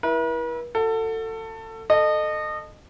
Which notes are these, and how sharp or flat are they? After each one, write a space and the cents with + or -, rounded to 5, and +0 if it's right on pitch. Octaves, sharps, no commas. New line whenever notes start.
E4 +0 B4 -45
F#4 -20 A4 +25
A4 +0 D#5 -25